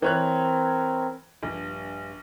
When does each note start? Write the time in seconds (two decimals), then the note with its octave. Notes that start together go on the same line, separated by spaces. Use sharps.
0.02 E3 C4 A#4 C#5 F#6
1.43 A#1 G2